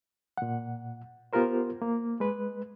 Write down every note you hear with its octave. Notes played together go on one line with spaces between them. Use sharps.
A#2 F#5
B3 F4 G4 A#4 C5
A#3
G#3 B4